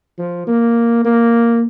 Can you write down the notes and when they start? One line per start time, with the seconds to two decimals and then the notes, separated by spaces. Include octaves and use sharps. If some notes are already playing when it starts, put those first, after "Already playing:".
0.18 F3
0.47 A#3
1.04 A#3